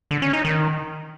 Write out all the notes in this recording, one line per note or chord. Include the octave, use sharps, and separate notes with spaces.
D3
C#4
D#4
D#3